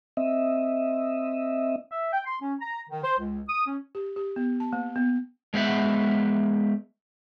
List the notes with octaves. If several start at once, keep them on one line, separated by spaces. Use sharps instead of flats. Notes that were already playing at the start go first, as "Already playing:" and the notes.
C4 D#5 E5
E5
G5
C6
C#4
A#5
D#3
C5
C#2
D#6
C#4
G4
G4
B3
A5
A#3
B3
G#3 B3 C5 E5 F#5